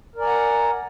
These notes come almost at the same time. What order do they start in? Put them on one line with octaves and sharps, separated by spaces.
A#4 D5 G#5 A#5 F#5